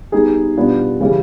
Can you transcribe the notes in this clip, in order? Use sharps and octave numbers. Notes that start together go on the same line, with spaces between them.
G3 B3 D#4 G#4
B2 G3 B3 D4 F4
C#3 E3 G3